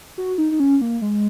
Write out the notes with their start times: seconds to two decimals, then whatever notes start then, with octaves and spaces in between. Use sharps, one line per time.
0.18 F#4
0.38 D#4
0.52 D#4
0.60 C#4
0.81 A#3
1.02 G#3